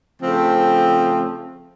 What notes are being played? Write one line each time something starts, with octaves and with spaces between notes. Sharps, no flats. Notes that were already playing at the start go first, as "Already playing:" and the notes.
C#3 F3 A3 C4